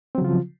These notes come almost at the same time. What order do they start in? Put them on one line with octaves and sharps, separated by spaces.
C4 F#3 C#3 F4 F3